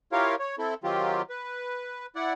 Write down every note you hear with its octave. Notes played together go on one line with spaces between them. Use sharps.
E4 F4 G4 A#4 C#5 F5
C#5
C4 E4 A4
D#3 F#3 C4 F4 G4
B4
E4 D5 F#5